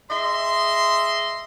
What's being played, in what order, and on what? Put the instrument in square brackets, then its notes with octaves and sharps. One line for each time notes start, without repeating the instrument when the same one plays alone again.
[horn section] G#4 D#5 E5 C6